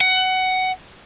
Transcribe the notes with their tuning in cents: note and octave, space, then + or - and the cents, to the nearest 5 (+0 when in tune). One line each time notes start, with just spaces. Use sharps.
F#5 +15